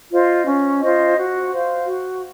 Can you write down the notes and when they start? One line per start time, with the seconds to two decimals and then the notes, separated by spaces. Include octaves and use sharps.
0.11 F4 C5 D#5
0.46 C#4
0.81 F4 C5 D#5
1.17 F#4
1.52 C5 F5
1.87 F#4